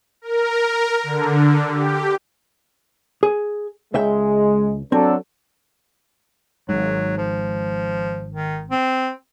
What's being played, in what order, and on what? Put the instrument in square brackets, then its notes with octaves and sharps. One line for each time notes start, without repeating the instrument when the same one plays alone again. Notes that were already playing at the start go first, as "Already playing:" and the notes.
[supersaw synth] A#4
D3
G4
[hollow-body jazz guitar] G#4
[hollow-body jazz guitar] C#2 E5 G5 [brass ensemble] G#3
[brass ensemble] F#3 D4 A4 [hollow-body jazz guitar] C4
[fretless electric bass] G#1 G#2 [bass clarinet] F#3
[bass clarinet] F3
D#3
C4